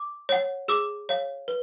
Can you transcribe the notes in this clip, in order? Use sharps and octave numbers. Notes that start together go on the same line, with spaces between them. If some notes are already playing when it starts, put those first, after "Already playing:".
Already playing: D6
C#5 F#5
G#4 D6 E6
C#5 F5
B4